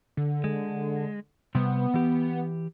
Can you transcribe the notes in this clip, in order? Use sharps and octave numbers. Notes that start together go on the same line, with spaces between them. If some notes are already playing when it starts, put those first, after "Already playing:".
D3
G#3
C3 G3 B3
E3 G4